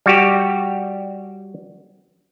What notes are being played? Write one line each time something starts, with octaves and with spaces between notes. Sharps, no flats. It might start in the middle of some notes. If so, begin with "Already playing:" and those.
G3 F#4 G4